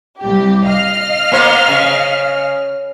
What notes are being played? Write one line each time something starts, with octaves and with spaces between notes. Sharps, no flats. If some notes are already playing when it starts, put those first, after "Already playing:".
C2 G4
D#5 F5 F6
A#3 B3 C5
C#3